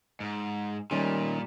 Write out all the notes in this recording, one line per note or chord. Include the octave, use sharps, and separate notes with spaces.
G#2
A#2 D#3 G3 A3 C#4